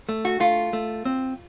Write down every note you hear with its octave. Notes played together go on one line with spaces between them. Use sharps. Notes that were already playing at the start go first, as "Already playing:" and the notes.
A3
F#4
A3 F4
A3
C4